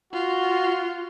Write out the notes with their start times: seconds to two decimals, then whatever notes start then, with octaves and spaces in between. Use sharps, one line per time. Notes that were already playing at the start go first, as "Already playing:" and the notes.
0.13 F4 F#4